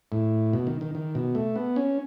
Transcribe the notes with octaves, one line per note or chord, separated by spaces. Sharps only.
A2
B2
D#3
D#3
D#3
B2
A3
B3
C#4